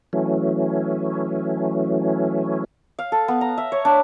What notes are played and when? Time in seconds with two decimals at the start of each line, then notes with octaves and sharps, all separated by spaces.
0.13 E3 F#3 A3 C#4
2.99 F5
3.12 A4
3.28 B3
3.41 A#5
3.58 E5
3.72 C#5
3.85 D4